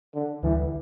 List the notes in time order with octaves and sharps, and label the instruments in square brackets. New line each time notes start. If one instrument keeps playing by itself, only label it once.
[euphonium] D3
[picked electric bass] D2 D3 G3 [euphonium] E3